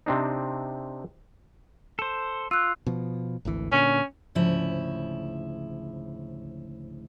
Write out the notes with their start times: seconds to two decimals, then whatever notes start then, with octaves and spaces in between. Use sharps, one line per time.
0.06 C3 C4 D4 D#4
1.99 A4 C5
2.51 F4 E6 F#6
2.87 B2 F3
3.45 G#1 D2 E3
3.72 A#2 D3 C#4
4.35 D2 G#2 C#3 F3 E4